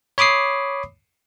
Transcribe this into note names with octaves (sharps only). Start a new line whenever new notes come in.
C#5 B5 D6 D#6 C7